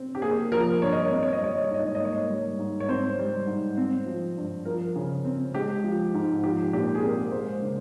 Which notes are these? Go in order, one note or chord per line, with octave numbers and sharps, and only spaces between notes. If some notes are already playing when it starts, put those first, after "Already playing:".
Already playing: C4
G4
A#3 G#4
F3 A#4
G2 C#5
D#5
C#5
C4 D#5
C#5
D#5
G3 C#5
D#5
C#5
G#2 D#5
C#5
D#5
A#3 C#5
G3
G#2
C#5
C4 C5
G3
G#2
C4
F3
G2
F3 A#4
C#3
C4
G#3 G4
F3
G#2
F3 G4
A#2 G4
G#4
C4 A#4
G#3 C5
C#3